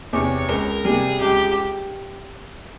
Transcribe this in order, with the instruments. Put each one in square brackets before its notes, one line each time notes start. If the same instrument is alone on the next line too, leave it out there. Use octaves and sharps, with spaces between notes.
[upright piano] E2 C3 [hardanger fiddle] C#5
[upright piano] C#2 [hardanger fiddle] A#4
[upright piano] C3 G3 [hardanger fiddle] G#4
[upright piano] C#2 [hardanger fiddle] G4